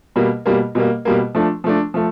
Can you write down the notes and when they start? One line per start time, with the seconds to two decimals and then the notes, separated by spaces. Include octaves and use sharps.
0.16 B2 G3 A#3
0.46 B2 G3 A#3
0.75 B2 G3 A#3
1.05 B2 G3 A#3
1.35 F3 A3 D4
1.64 F3 A3 D4
1.94 F3 A3